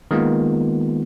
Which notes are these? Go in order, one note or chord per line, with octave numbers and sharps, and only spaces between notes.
D#3 G#3 A#3 B3 F4